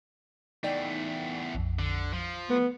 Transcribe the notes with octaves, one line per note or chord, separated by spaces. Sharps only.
E2 A3 D#4 D5 G5
A#1 F2
D3
F3
A3 B3